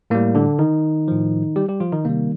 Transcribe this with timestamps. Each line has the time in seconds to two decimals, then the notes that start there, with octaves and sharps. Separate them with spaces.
0.10 A2 G3 A#3
0.35 D3 D4
0.59 D#3 D#4
1.08 A2 F3
1.56 G3 G4
1.68 G3 G4
1.80 F3 F4
1.92 D#3 D#4
2.05 C3 D#3 G3 A#3